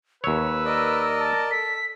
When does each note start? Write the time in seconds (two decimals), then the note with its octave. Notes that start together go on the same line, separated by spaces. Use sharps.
0.24 D#2 B4 C#5 E6
0.65 A#4 D5 D#5
1.19 A5
1.51 A4 B6